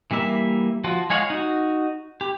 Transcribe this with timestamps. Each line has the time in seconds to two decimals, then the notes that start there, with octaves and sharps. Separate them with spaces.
0.11 E3 G3 A#3 E5
0.84 F3 F4 F#4
1.10 G#3 G#4 C#5 F5 F#5
1.30 D#4 F#4
2.21 G4